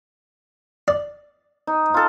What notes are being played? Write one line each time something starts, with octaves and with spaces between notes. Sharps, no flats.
D5
D#4
F4 A4